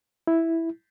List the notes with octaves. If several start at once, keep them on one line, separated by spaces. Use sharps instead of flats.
E4